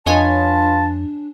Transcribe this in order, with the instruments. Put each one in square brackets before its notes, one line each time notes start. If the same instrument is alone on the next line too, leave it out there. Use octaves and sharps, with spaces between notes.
[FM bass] F2 [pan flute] D4 [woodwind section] F4 B4 A5 [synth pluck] C#5 D#5 G#5